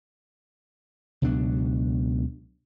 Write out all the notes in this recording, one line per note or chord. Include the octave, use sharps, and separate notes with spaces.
C#2 B2 F#3 D4